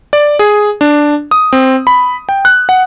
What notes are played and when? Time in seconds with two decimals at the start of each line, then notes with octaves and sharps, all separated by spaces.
0.13 D5
0.39 G#4
0.81 D4
1.31 D#6
1.53 C4
1.87 B5
2.29 G5
2.45 F#6
2.69 F#5